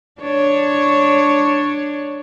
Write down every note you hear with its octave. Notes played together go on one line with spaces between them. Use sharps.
D4 C#5